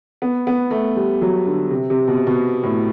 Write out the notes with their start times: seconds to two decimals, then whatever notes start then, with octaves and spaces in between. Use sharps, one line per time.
0.22 B3
0.47 B3
0.71 A3
0.96 G3
1.21 F#3
1.46 D3
1.71 C3
1.90 C3
2.08 B2
2.27 B2
2.63 A2